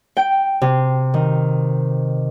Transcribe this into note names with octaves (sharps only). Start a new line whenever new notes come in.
G5
C3
D#3